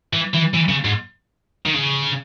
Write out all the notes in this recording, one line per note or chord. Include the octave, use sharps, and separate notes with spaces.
E3
E3
E3
C#3
G#2
D#3
C#3